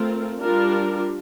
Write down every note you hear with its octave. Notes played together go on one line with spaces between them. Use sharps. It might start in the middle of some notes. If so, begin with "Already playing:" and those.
Already playing: A3 C4 F4 A#4
G3 D4 F4 A#4